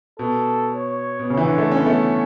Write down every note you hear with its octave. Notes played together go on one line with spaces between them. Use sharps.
B2 A4
C#5
B2
C#3 C#5
E3
D3
A3
C#4
B3
A3 C#5